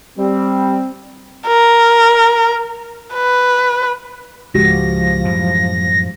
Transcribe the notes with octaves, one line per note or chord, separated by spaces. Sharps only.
G3 C4
A#4
B4
C#2 G#2 F3 G#3 F#4 G4 A#6
F#2 A2 E3